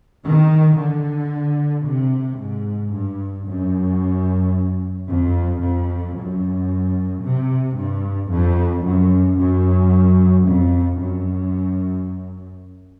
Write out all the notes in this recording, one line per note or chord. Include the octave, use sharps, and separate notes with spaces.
D#3
D3
C3
G#2
G2
F#2
F2
F2
F#2
C3
G2
F2
F#2
F#2
F2
F#2